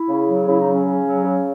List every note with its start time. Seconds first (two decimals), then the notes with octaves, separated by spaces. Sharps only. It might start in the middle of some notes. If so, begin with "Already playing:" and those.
Already playing: E4
0.09 C#3
0.28 F#3
0.48 C#3 E4
0.61 D#4
0.67 F#3
0.73 C#4
0.86 C#3
1.06 F#3
1.24 C#3